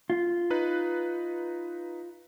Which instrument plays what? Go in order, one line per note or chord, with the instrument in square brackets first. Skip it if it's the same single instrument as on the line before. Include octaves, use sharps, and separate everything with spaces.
[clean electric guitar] F4
[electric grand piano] D#4 B4 F#6